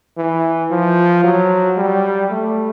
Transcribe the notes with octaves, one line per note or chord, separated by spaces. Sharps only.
E3
F3
F#3
G3
A3